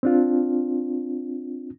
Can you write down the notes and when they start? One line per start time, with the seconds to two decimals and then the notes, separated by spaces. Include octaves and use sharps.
0.03 C4 D4 F4